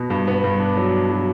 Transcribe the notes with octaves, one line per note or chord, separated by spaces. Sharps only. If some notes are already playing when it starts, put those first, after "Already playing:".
Already playing: B2
G2
B3
G2
D4
F#3
D4
F#3